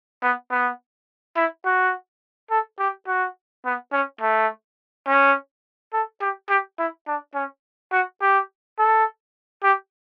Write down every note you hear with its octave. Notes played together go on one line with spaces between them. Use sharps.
B3
B3
E4
F#4
A4
G4
F#4
B3
C#4
A3
C#4
A4
G4
G4
E4
D4
C#4
F#4
G4
A4
G4